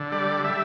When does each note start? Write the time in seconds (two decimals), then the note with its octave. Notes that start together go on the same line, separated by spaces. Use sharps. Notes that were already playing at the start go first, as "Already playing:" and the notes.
Already playing: D3
0.12 G3 D5
0.44 G3 E5